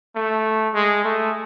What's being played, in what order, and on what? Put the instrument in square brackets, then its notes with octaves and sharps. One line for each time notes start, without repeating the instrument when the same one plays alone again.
[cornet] A3
G#3
A3